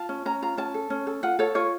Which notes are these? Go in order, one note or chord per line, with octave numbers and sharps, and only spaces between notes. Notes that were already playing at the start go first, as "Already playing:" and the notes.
Already playing: F4 A5
C#4
C#4 A#5
F4 A#5
C#4 A5
A4
C#4
A4
F4 F#5
A4 C#5
F4 C#5